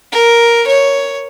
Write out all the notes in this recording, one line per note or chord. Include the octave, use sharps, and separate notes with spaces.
A#4
C#5